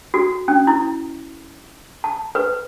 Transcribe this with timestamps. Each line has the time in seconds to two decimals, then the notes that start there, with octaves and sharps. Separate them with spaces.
0.14 F#4
0.48 C#4
0.67 E4
2.04 A5
2.35 B4